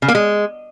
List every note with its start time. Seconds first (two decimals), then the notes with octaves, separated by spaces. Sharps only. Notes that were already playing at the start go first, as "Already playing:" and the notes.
0.02 C#3
0.08 A#3
0.15 G#3